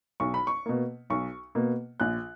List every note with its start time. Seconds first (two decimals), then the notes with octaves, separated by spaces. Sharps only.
0.20 B1 C#6
0.34 B5
0.47 C#6
0.66 B2 A#3
1.10 B1 C#6
1.55 B2 A#3
2.00 A#1 F#6